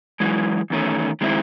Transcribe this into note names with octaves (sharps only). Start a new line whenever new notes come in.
F#2 C#3 E3 G#3
E2 D#3 A3 C#4
D#3 G#3 C4 E4